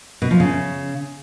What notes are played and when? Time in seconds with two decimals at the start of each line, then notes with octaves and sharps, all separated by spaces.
0.22 B2
0.31 F3
0.40 C#3